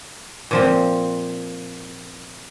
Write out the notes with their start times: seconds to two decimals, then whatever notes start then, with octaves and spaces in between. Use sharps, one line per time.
0.51 A#2 F3 C4